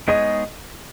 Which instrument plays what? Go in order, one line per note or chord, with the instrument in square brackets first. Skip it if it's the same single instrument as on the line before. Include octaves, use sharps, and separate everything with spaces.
[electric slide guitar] G#3 B3 D#4 G#4 C#5 [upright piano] D#5